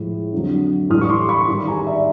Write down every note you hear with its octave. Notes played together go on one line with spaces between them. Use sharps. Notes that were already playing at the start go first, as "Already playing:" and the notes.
Already playing: A2 F3 G#3
F2 D3 F#3
A2 E3 G3 D#6 F6
C#6
C6 D6
B5 C#6
G#2 D#3 G3
G#5 A#5
D5 E5